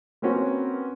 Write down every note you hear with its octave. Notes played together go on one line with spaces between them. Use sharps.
A#3 C4 C#4 F#4 A#4 B4